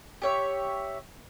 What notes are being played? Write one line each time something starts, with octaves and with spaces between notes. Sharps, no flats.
G4 C#5 E5